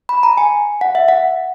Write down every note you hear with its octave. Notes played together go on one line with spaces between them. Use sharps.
B5
A#5
G#5
F#5
E5
F#5